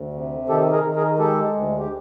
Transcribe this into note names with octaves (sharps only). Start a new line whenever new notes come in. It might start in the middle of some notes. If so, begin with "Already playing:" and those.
Already playing: D2
C3
D#3 G4 A4
G#4 A#4
D#3
G#4 A#4
G#3 G4 A4
D2
G4